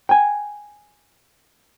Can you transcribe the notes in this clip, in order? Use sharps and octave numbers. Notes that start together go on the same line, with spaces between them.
G5 G#5